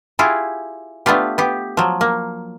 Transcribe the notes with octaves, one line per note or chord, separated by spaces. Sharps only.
E4 F4 G4 G#4
A3 B3 D4 F4 G4
B3 G4
F3 F#3
A#3